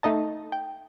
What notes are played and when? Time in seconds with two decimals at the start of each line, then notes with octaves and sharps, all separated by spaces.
0.03 A3 D#4 D#5 A5
0.52 G5